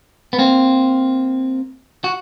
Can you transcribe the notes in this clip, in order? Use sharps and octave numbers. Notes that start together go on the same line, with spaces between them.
B3
A#3 C4
F#4